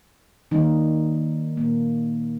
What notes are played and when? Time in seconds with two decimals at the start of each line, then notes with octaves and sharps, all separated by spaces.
0.51 D#3 G3 A#3 D#4
1.57 A#2 G3 A#3